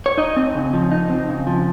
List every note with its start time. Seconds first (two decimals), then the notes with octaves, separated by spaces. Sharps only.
0.06 C#5
0.18 D#4 D#5
0.36 C4
0.55 C#3
0.73 F3
0.91 D#4
1.10 C4
1.29 C#3
1.47 F3